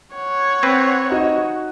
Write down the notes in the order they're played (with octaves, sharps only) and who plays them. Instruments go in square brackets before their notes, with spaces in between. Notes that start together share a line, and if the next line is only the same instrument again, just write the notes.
[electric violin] C#5 F#5
[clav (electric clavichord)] C4 B4
[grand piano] D#4 F#4 D#5